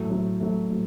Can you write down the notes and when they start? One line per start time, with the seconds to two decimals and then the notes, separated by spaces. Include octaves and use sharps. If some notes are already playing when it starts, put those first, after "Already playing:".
Already playing: A2 F#3 A3
0.10 A2 F#3 A3
0.40 A2 F#3 A3
0.70 A2 F#3